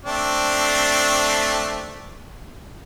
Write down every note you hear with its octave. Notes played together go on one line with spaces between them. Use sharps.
A3 C4 D4